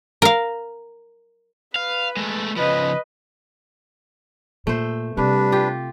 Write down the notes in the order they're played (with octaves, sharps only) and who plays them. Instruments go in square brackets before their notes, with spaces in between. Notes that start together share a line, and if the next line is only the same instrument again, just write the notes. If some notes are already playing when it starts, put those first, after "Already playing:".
[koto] A#4 F5
[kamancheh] B4 [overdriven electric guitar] F5
[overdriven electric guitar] G#3 A3
[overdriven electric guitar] C#3 F3 [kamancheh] B4 D#5
[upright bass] A#2 [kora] A3 C5
[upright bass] C3 C4 [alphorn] G3 [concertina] D4 B4
[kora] F4 G4